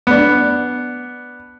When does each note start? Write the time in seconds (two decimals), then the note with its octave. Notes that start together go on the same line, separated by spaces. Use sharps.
0.07 B3 D4